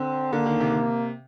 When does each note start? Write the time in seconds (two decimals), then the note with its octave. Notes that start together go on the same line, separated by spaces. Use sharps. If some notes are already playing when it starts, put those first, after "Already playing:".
Already playing: D3 C4
0.33 D3 A#3
0.46 D#3
0.60 C3